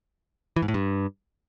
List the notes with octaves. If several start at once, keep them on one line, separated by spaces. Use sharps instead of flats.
E3
G#2
A2
G2